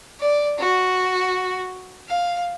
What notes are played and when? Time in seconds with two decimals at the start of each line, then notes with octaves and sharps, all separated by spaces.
0.19 D5
0.57 F#4
2.08 F5